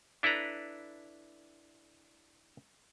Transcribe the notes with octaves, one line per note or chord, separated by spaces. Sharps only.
D4 E4 A4 B4 A#5